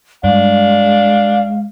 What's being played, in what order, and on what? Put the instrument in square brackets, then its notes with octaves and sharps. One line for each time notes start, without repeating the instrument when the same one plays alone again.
[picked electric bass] G2 [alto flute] G#3 [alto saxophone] D4 [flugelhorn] F5